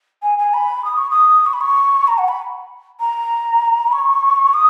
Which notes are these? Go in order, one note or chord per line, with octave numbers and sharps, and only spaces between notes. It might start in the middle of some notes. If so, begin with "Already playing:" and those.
G#5
G#5
B5
D#6
C#6
D#6
C#6
B5
C#6
A#5
F#5
B5
A#5
B5
C#6
D#6